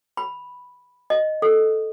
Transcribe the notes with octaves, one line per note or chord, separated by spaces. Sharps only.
B5
D#5
A4